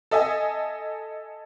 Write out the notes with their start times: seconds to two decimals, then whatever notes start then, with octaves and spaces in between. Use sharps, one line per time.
0.11 A4 D#5 E5 G#5